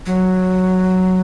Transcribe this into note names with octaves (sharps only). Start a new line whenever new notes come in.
F#3